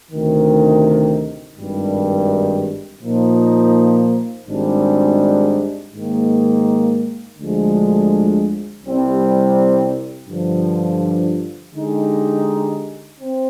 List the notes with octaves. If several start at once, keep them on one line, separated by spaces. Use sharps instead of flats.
D2 C3 D#3
G#1 G2 D#3 G3
A#2 F3 A#3 D#4
G#1 G#2 G3 D4
G#2 D#3 A#3
D2 D3 F3 G#3
C2 C3 G3 C4
G2 D3 F3
D3 G#3 D#4 G4
C4